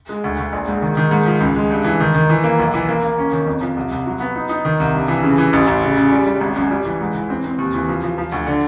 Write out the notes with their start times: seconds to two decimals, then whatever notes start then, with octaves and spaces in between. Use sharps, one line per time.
0.09 G#3
0.24 D2
0.38 D2
0.53 A#1
0.68 G#2
0.82 D#3
0.97 D#3
1.11 G#2
1.26 F3
1.40 C#2
1.56 G#3
1.70 G2
1.84 E3
2.00 D#3
2.14 D#3
2.29 E3
2.44 A#3
2.59 B1
2.74 E3
2.89 A#3
3.03 A#3
3.18 C#4
3.32 D#3
3.46 F2
3.61 F3
3.76 C2
3.91 C2
4.06 F#3
4.20 B3
4.35 D#4
4.49 D#4
4.65 D#3
4.80 C2
4.95 G2
5.08 E3
5.23 C#3
5.38 E3
5.53 A1
5.67 A1
5.83 C#3
5.97 C#3
6.12 G3
6.26 G3
6.41 G#1
6.56 F#2
6.71 G3
6.85 E3
7.01 G#2
7.15 E3
7.30 C4
7.44 C4
7.58 D#2
7.74 E3
7.89 F3
8.03 F3
8.18 F3
8.32 D2
8.47 D3